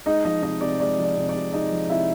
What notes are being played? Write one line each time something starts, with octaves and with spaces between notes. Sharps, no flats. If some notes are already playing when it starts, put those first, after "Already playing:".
G#3 D#4 D#5
F3 D#4 D#5
C3 D#4 D#5
C3 D5
G#3 D5
F3
D5
C3
D5
C3
G#3 D#4 D#5
F3
C3 E4 E5